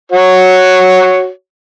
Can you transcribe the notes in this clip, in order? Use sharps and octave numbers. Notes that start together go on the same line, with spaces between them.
F#4 C#5